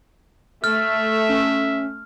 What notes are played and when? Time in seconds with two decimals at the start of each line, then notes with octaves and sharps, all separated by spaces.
0.64 A3 E5 F6 A6
1.29 C#4